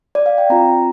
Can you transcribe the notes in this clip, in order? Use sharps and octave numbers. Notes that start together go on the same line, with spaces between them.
D5
F5
G5
C4 F4 A#5